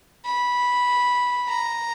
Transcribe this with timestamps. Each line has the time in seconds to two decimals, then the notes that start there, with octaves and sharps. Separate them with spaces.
0.25 B5
1.48 A#5